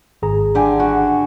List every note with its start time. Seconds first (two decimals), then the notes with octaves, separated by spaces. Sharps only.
0.22 G#1 G#4 A#5
0.55 D3 G4 G#5
0.80 F#4